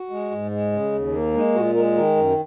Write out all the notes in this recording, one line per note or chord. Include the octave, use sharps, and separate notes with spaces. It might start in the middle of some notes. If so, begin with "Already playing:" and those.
Already playing: F#4
G#3
G#2
G#3
C#3
D#2
A#3
G#3 D#4
A#2 F#4
G#3 A#4
D#3 A#4
F#2